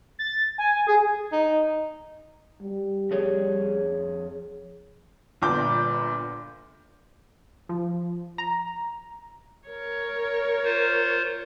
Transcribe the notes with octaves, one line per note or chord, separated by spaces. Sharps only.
A6
G#5
G#4
D#4
G3
F2 G#4 C#5
G1 A#2 D6 G6
F3
A#5
A#4 C#5
F4 C5